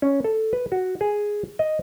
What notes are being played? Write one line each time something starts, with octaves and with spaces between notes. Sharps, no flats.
C#4
A4
B4
F#4
G#4
D#5